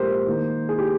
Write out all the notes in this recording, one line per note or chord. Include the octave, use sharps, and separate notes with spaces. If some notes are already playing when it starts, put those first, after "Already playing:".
Already playing: A#2 F3 G#3 G4 A#4 C5
D#3 A#3 D#4
G#4
G4